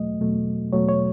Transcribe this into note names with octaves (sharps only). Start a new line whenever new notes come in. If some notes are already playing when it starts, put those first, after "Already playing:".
Already playing: E2 B2 F#3 A3 D#5
E2 B2 F#3 A3
E2 B2 F#3 A3 C#5
C#5